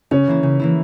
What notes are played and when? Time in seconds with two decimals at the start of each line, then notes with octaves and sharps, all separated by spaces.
0.11 C#3 C#4
0.27 E3 A#3 E4
0.43 C#3
0.60 E3 A#3 E4